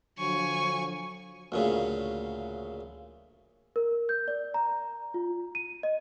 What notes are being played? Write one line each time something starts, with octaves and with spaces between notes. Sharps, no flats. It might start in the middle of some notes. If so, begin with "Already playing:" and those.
D3 F3 F#3 G#5 C#6
D2 A#2 C#3
A#4
G6
D5
A#5
F4
D#7
D#5